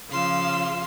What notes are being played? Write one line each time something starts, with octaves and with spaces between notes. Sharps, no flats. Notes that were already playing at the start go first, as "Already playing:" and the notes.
C#3 F3 F4 F5 C6 E6